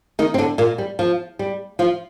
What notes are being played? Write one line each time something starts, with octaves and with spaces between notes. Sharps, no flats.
D#3 D#4
C4
D3 D4
A#2 A#3
G3
F3
G3
F3 F4